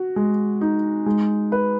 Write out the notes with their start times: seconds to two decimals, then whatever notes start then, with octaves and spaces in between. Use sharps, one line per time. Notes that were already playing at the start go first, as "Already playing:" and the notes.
Already playing: F#4
0.16 G#3
0.61 D#4
1.06 G#3
1.52 B4